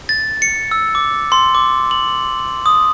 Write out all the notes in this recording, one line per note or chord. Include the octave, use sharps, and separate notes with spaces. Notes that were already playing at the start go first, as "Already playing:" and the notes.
A6
C#7
E6
D6
C6
D6
F#7
D#6